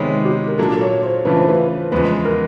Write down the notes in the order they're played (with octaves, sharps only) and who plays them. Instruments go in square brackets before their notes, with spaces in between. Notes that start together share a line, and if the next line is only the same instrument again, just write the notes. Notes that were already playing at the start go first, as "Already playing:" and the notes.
Already playing: [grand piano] C3 D#3 G#3 B3 [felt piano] C#5
[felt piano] G4
A#4
[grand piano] A#2 F#3 A#3 D4 [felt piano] A4
[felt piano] C#5
C5
[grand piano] C#3 E3 A3 D4 F4 [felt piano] B4
[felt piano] C5
B4
[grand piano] E2 C#3 F3 G#3 B3 [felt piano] B4
[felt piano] A#4